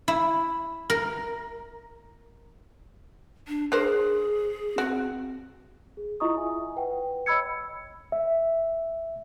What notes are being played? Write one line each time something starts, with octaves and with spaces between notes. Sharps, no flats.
E4
A#4
D4
D4 G#4 A#4 C5
C4 F#4
G#4
E4 F4 D#5 A#5 C#6 D#6
E5 G#5
B4 F#5 G5
C#5 D#5 B5 E6 G#6 C#7
E5